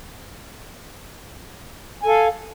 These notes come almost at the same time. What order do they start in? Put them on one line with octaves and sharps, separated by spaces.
G#5 A4 F5